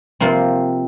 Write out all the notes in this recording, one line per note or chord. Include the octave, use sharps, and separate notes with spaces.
C3 F3 A#3 C4